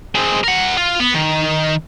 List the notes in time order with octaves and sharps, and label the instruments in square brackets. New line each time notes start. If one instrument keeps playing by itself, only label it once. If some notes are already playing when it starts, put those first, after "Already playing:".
[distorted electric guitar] G#3 C4
A#4 F#5
F4
B3
D#3